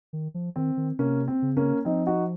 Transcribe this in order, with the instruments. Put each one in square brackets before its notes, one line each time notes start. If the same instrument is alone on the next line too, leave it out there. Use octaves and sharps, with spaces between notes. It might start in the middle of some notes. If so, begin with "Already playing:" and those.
[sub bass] D#3
F3
[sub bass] D#3 [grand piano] C4
[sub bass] D#3
[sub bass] C3 [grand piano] A#3 C#4
[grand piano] C4
[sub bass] C#3
[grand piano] A#3 C#4
[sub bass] F3 [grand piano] C4 D#4
[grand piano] D#4 F#4